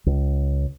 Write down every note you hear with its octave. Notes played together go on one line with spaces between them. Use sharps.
C#2